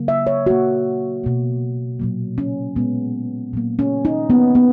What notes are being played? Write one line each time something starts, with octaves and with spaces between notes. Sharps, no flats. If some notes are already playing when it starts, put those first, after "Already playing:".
Already playing: C#3 F#3 A#3
E5
C#5
A#2 A#3 F#4
B2 A#3
A#2 F#3 A#3
C#4
A#2 G#3 B3
A#2 F#3 A#3
C#4
D#4
D#3 A#3 B3
B3